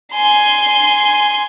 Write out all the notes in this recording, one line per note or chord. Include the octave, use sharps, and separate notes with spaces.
G#5 C6